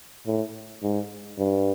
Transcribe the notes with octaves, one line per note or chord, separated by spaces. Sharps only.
A2
G#2
G2